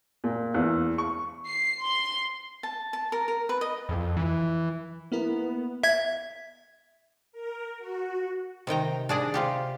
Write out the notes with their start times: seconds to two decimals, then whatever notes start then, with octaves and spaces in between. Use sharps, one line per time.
0.24 A#2
0.54 E2
0.98 C#6
1.48 C7
1.84 C6
2.63 A5
2.93 A5
3.12 A#4
3.28 A#4
3.49 B4
3.61 D#5
3.89 F2
4.17 E3
5.12 A#3 B3 E4 A#4
5.83 E5 G#6
7.32 A#4
7.79 F#4
8.67 C3 D#3 G5 A#5
9.09 D4 G#4 D5 D#5
9.34 C3 F4 G4